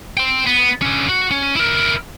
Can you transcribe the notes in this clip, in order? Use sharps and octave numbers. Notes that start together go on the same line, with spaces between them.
G5 C6
B3
D3 C#4
F#4
C#4
E4 A#4